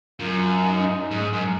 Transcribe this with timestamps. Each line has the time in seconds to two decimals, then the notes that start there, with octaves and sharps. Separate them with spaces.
0.20 F#2 F4
0.65 D#4
1.11 G#2
1.33 F#2